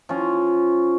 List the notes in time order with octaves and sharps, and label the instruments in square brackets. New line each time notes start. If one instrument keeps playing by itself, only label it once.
[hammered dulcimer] F3 C#4